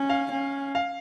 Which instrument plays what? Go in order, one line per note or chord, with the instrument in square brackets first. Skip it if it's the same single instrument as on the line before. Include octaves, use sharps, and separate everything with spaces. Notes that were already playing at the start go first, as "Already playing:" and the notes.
Already playing: [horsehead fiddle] C#4
[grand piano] F5
[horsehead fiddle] C#4
[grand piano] F5